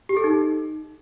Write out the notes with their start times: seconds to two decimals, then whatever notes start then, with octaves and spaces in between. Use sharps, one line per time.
0.09 G4
0.17 A4
0.24 D#4